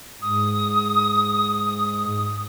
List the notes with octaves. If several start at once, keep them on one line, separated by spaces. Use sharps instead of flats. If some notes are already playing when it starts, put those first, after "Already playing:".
G#2 D#6